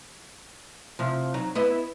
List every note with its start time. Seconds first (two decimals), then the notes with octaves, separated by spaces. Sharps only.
0.99 C3 F3
1.34 F#3 D#4
1.55 B3 E4 D#5